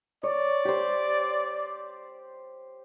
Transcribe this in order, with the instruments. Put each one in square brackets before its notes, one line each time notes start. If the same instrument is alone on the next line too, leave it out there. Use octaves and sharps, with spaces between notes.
[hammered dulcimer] C#5 [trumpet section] D5
[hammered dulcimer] G4 C5